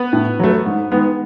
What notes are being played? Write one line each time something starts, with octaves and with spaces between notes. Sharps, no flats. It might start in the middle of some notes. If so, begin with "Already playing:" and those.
Already playing: B3 B4
A2
F#3 A3
G#2
D#3 G#3 B3